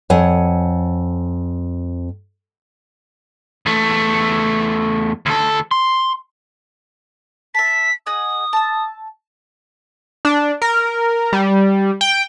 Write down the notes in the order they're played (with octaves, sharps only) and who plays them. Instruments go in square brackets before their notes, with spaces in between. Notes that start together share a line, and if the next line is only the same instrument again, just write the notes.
[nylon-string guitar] F2 C#5 F#5 G#5
[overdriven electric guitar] E2 A3
D2 A4
C6
[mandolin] E5 A5 [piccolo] B6
[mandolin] G#4 D#5 F#5 [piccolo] D#6
[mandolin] A5 E6
[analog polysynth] D4
A#4
G3
G5